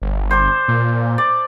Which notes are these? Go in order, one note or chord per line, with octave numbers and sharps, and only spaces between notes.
G1
C5 D5 A5
A#2
D5